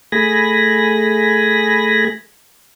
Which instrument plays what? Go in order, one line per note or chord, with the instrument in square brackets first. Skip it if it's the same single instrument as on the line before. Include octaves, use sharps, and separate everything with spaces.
[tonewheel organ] A3 G#4 G#5 B5 A#6